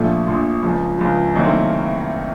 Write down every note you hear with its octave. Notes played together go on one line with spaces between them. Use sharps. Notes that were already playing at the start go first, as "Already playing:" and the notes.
Already playing: A#1 A#2 F3 A3
A#1 A#2 F3
C#2 C#3 F3
C#2 C#3 F3
C2 C3 D#3 F#3 A#3
A3 C4